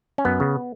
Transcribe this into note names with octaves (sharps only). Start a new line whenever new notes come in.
C#4
F#2 B3
C#3